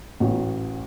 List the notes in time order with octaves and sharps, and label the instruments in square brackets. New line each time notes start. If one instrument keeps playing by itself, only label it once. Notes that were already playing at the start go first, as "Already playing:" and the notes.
[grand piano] A1 F#4